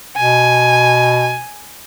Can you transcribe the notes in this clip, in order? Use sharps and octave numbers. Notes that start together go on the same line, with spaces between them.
B2 G#5